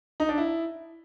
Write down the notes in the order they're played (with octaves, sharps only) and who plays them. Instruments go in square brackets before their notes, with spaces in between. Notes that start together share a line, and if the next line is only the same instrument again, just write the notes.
[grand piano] D#4
D4
E4